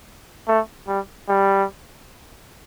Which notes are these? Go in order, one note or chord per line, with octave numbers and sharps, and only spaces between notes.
A3
G3
G3